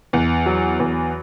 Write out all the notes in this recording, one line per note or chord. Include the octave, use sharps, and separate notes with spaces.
E2
F#3
E2